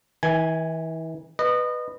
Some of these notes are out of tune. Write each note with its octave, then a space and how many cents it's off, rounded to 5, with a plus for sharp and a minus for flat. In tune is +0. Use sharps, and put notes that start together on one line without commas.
E3 -35 G#5 +0
B4 +0 D#5 -25